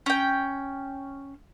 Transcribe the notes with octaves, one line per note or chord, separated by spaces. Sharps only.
C#4 G5